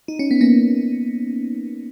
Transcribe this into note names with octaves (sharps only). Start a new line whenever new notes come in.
D#4
C#4
B3
A#3 C#4